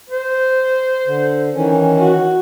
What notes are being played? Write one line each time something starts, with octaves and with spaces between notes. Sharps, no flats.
C5
D3
D#3 E3 C#4
F#4